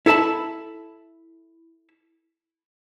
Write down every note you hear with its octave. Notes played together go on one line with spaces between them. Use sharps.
E4 A4 E5 A5 B5